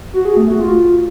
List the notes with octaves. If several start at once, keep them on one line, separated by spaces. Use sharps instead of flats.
F#4
G#4
A3
F#4
F4